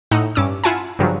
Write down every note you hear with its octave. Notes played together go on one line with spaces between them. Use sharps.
A2 D#4 F#5 E6
G2 C#4 D6 E6
E4 F4 F#5 G#5 A5
G2 C#3 F3 F#3